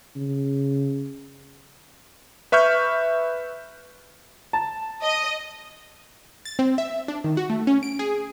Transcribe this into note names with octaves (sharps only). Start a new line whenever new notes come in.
C#3
B4 E5 C#6 F6 G6
A5
D#5
A6
C4
E5
D4
D#3
F#4
A3
C#4
D7
G#4